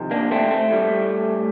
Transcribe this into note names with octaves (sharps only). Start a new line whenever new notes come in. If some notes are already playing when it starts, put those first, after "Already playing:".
Already playing: F2 C3 D#3
A#3 D4
A3 C4
A3
A2 G3